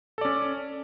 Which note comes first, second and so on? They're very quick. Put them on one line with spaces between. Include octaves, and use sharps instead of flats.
A4 D5 C#4